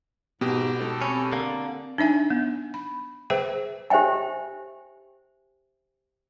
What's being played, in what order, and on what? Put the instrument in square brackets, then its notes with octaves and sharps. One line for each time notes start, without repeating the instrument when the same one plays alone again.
[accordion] G#2 [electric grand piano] B2 G4 [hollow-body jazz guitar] B3
[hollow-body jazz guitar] G#3 D#4 C5 [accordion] A4
[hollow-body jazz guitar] C4 B5 [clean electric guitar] C#4
[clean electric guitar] D3 A#3
[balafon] D4 D#4 E5 G#5
B3
B5
G#4 B4 C5 E5 G5
[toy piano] G4 C5 E5 G5 G#5